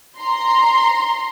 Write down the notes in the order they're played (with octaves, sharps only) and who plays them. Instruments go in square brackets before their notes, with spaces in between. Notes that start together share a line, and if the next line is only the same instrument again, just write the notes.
[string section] A#5 C6